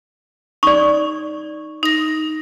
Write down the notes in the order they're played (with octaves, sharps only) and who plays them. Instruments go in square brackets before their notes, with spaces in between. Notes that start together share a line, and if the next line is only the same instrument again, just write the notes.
[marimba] D#4 [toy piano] D5 C#6
[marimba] D#4 A#6